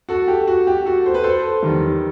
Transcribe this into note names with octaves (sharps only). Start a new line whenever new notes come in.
F#4 A4
G4
F#4
G4
F#4 A4
C5
B4
A4 C5
E2 D#3 G3